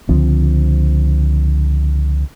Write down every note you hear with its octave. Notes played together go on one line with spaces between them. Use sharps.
C#2 D3 F3 C4